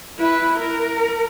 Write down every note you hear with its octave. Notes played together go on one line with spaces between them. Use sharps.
E4 B4
A#4